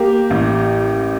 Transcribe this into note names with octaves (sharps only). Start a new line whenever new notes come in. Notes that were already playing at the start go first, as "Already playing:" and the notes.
Already playing: A#3 G4
A1